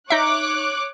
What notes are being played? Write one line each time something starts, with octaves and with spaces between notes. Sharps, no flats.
D#4 C#5 E5 D6 F#6